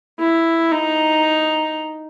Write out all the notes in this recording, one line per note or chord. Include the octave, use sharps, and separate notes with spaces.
E4
D#4